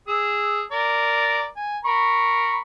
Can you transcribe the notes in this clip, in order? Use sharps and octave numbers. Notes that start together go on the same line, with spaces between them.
G#4 E6
A#4 D5
G#5
A#4 B5 C#6